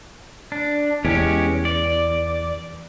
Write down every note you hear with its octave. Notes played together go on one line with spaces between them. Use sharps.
D4
E2 G#3 C#4 G4
D5